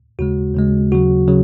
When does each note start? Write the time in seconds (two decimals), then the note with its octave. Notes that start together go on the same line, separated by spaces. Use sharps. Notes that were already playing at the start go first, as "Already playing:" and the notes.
0.19 D#2 C#3 G#3 F#4
0.55 D#2 C#3 G#3
0.92 D#2 C#3 F#3 F#4
1.28 C#3 F#3